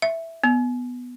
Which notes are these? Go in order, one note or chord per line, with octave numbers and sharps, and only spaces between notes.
E5
B3